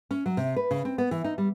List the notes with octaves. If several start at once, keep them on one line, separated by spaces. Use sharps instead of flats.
C#4
F#3
C3
B4
C#3
C4
B3
E3
D#4
G3